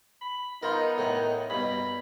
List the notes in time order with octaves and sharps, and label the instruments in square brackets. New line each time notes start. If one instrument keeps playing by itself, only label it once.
[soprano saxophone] B5
[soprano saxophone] B3 [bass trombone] D#4 [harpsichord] F4 A#4
[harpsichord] A2 D#3
[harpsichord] G2 B2 [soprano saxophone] B5